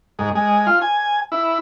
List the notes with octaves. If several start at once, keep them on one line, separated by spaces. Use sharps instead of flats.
G#2
G#3
F4
G#5
E4